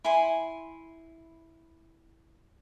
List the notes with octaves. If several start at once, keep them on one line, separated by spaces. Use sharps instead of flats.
E4 G#5 C6